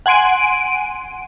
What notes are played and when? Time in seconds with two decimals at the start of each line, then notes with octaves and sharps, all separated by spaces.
0.06 F#5 G#5 C6 D7 D#7